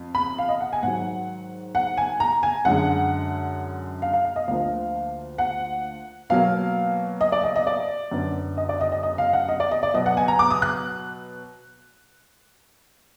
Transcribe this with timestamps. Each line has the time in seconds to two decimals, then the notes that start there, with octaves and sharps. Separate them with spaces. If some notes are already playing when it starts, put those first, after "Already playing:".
Already playing: F2
0.15 B5
0.38 F5
0.49 D#5
0.61 F#5
0.73 G#5
0.83 G#2 D#3 F#3 F#5
1.75 F#5
1.97 G#5
2.20 A#5
2.43 G#5
2.65 F#2 D3 G#3 F#5
4.02 F5
4.13 F5
4.25 F5
4.36 D#5
4.48 D2 D3 F3 A#3 F5
5.38 F#5
6.30 B2 F#3 A#3 F5
7.21 D#5
7.32 D5
7.43 D#5
7.56 D#5
7.67 D5
8.11 F#2 D3 F#3 B3
8.57 D#5
8.69 D5
8.81 D#5
8.92 D#5
9.03 D#5
9.18 F5
9.33 F#5
9.49 D#5
9.60 D5
9.71 D#5
9.83 D5
9.94 B2 F#3 B3 D#5
10.06 F#5
10.17 G#5
10.28 A#5
10.39 D6
10.50 D#6
10.62 F#6